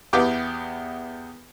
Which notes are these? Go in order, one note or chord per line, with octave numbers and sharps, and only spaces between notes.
E2 B3 G4 G5 D6